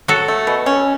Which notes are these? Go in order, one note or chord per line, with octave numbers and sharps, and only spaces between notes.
F#3 F#4 A4
A3
B2
C#4